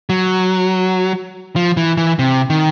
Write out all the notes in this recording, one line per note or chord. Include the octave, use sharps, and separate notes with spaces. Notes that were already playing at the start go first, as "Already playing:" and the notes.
F#3
F3
E3
E3
C3
D#3